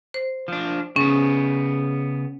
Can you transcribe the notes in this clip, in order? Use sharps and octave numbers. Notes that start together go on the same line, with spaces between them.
C5
F3 D4
C#3 B3 C#4